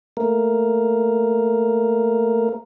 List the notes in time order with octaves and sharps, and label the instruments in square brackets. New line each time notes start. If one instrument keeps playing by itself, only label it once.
[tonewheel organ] A3 A#3 A#4